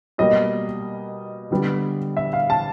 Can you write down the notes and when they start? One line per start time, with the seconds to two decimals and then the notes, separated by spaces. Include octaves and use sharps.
0.18 B2 G3 A#3 D#5
1.51 D3 G3 B3
2.17 E5
2.33 F5
2.50 A5